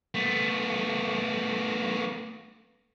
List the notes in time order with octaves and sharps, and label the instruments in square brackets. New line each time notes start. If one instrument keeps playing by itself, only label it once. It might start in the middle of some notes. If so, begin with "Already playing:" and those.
[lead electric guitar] A3 B3